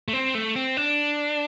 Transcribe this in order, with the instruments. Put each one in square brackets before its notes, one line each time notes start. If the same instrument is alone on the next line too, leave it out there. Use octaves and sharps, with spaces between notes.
[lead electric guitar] A3
C4
A3
C4
D4